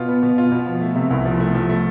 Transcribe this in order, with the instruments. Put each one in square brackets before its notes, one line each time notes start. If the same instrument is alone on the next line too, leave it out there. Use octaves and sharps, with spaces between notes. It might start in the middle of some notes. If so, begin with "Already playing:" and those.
Already playing: [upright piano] B2 F4
B3
B2
F4
B2
F3
A3
C3
C2
F3
A3
F3
A3